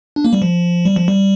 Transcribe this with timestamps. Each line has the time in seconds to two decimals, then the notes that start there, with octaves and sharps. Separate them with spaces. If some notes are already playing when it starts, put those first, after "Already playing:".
0.16 D4
0.25 A#3
0.33 G3
0.42 F3
0.85 G3
0.96 F3
1.08 G3